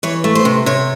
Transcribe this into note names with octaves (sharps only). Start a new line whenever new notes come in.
E3 C#5
A3
C5
C3
C3 C#5